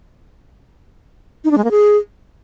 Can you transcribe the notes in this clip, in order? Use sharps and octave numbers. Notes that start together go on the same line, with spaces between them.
D#4
D4
G#3
A#3
G#4